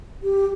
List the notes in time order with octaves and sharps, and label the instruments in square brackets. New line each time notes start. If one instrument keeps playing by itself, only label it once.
[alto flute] G4